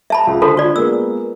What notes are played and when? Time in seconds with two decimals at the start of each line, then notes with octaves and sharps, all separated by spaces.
0.10 E5 A5 B5
0.27 C#2
0.42 D3 A4 C5 B5
0.57 F4 D5
0.76 G#3 A#3 B3 E6